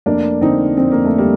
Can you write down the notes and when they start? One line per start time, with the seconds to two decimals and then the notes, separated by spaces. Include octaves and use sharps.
0.06 F1 A#3 D4
0.41 D3 C4 D#4
0.77 F2 C4
0.92 A#3
1.05 A3
1.18 G3 A#3